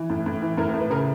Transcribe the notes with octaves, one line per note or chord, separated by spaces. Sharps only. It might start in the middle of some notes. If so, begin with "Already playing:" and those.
Already playing: E3
A2
A2
E3
A2 A#4
A#4
A2
B4
C#3 A#4